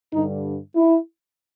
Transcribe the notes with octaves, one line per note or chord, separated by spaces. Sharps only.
G2 D3 G3 D#4
E4